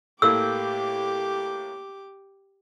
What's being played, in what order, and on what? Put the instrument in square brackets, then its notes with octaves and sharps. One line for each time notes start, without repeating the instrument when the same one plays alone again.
[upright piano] A2 A3 A#3 [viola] G4 D6 [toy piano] E6